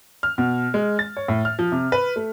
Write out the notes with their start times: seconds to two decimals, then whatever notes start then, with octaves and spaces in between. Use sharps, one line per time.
0.23 F6
0.38 B2
0.74 G#3
0.99 A6
1.17 C#5
1.28 A2
1.45 F6
1.59 F3
1.72 C3
1.92 B4
2.16 A3